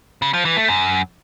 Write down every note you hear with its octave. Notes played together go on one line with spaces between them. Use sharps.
C#3
F3
E3
A3
F#2